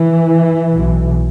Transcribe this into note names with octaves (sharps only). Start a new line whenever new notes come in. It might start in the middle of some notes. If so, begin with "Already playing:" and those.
Already playing: E3
B1 B2